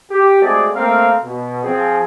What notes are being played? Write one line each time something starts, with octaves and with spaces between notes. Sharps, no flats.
G4
G#3 A3 C4 F#4 G#4 D5
A3 A#3 C4 A#4 F5
B2
F3 C4 G#4